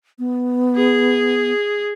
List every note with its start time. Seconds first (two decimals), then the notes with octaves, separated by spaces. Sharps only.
0.19 B3
0.76 G#4